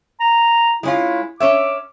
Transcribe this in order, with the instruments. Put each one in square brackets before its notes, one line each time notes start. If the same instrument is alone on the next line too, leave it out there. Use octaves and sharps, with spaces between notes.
[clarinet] A#5
[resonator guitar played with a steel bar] G#3 C#4 F4 [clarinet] E4
[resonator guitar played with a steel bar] C#4 C#5 E5 [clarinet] D6